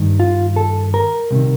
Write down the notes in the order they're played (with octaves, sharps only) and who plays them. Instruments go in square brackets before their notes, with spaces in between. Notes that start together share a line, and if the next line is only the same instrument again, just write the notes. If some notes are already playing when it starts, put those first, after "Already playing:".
Already playing: [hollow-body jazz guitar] G2 D#3
F4
A4
A#4
C2 C3 D#3